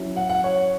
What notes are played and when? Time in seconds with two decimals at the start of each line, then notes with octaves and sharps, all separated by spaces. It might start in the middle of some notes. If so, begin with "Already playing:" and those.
Already playing: F#3 C#4 E4
0.16 F#5
0.29 F#5
0.44 C#5